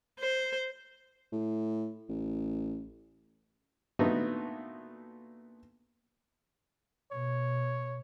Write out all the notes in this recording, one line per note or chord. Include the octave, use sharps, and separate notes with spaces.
C5
A2
A1
A#2 A3 B3 D4 D#4 F#4
B2 C#5